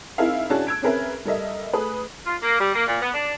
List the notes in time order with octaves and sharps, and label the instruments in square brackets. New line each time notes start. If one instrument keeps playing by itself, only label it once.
[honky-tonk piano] C4 D#4 E4 G#4 A#4 F5
C#4 D4 F#4 G#4 A5 F#6
E6 G#6 D7
C4 C#4 G#4 A#4 B4 E5
G3 A4 A#4 D#5 E5
A3 G#4 B4 D#6
[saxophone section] F4
A#3
G3
A#3
A#2
B3
D4